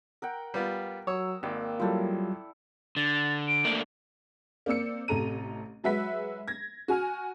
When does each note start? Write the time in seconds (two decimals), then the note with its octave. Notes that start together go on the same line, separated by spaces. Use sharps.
0.22 A#4 F#5 G5
0.54 G3 B3 F4
1.07 F#3 C#5 D#6 E6
1.43 G#1 A#3 D5 G5
1.80 F#3 G3 E4 F4 A4
2.96 D3 A6
3.48 D7
3.65 A3 A#3 D4
4.66 A#3 C4 D5 E6 C#7
5.08 A1 C3 A4 A#5 D#7
5.84 F#3 G#3 B4 E5 F#5 B6
6.48 G#6 A#6
6.88 F#4 G#5 F6